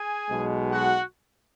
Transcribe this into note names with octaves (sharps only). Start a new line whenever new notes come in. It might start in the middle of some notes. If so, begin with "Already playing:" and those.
Already playing: G#4 G#5
B1 B2 G#3
F#4 F#5